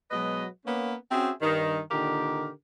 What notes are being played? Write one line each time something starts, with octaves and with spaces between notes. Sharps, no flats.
B2 F#3 G#3 B4 D#5
A#3 B3 C#4
C4 C#4 F#4 G#4 C5 E5
G2 D#3
A#2 D3 D#3 G4 A#4